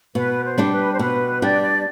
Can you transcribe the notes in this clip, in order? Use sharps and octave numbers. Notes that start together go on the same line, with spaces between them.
B2 B4
C5
G3 D4 G4
B4
C5
B2 B4
G3 D4 G4 D5